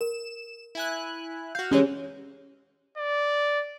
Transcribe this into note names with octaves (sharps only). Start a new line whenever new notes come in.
A#4 E7
E4 G#5 F#6
F#4 F5 G6
E3 G#3 C#4 D#4 G4 G#4 C#5
D5